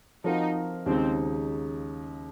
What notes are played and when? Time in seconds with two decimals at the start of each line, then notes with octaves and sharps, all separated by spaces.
0.24 F3 C4 D#4 F#4 A#4 F5
0.86 D#2 C#3 G#3 C4 D#4